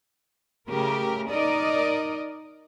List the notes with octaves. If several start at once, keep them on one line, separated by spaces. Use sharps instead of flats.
C#3 A3 G4 A#4
D#4 A#4 D5 D#5